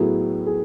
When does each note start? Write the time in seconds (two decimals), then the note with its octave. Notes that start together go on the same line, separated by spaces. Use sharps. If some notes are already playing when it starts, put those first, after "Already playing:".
Already playing: A2 F#3 B3 E4 G#4
0.47 G#4